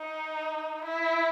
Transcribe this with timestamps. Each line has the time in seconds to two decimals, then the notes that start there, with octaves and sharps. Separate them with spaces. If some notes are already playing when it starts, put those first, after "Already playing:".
Already playing: D#4
0.85 E4